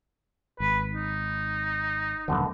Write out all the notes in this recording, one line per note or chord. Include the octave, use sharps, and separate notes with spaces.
G#1 B4
D#4
D#1 F#2 B2 D3 A3 B3